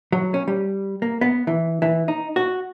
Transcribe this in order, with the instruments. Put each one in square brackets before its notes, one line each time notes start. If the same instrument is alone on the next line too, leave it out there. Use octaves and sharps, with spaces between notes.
[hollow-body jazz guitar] F#3
C#4
G3
A#3
B3
E3
E3
D#4
F#4